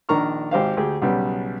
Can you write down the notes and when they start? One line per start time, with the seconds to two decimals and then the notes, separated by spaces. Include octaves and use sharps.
0.09 A#1 D#3 D4 A#5 C#6 F6
0.51 G#1 G4 C5 F5
0.77 D2 G4 G#4
1.02 B1 C#3 G3 B3